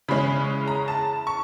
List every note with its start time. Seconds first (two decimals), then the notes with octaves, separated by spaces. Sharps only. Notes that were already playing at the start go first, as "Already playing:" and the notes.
0.08 C#3 E3 G#3 C#4 B5
0.68 A#5
0.88 A5
1.27 C#6